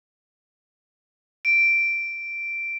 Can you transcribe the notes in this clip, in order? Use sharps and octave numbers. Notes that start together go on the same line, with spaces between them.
D7